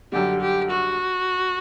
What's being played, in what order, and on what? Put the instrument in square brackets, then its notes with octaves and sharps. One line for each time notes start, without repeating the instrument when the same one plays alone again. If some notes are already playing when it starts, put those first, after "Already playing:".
[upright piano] F#2 D3 G3 [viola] G4
[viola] G4
F#4